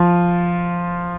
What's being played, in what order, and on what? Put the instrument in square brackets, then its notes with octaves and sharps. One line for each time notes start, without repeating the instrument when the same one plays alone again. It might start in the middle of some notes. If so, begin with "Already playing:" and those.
Already playing: [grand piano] F3 F4